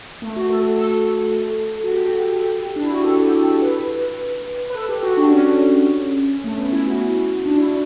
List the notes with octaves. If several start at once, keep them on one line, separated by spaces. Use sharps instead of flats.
A3
F#4
A4
A4
F#4
G4
F#4
G4
G4
D4
E4
F#4
G4
A4
G4
A4
B4
B4
A4
G4
F#4
D4
C#4
A3
B3
E4
F#4
D4
E4